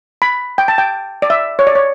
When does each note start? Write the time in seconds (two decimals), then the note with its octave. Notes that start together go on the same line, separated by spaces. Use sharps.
0.22 B5
0.58 G5
0.68 A5
0.78 G5
1.22 D5
1.30 E5
1.59 C#5
1.67 D5
1.75 C#5